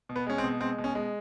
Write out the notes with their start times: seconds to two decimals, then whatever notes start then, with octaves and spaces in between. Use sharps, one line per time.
0.09 B2
0.16 B3
0.27 G#3 C#4
0.38 C4
0.44 B2
0.61 G#3 C4
0.78 B2
0.84 C#4
0.95 G#3